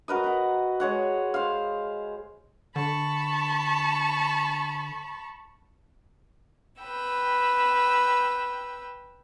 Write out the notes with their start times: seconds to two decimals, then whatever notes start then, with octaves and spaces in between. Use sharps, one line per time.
0.08 F#4 A#4 B4 D#5
0.24 B4 F#5
0.80 G#3 C#5 F#5
1.34 C5 F5
2.76 D3 A5 B5 C#6
6.82 B4 G5 E6